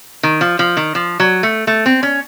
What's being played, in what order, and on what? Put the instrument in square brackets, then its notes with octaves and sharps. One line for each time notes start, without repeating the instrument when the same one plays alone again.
[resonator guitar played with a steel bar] D#3
F3
F3
D#3
F3
F#3
A3
A3
C4
C#4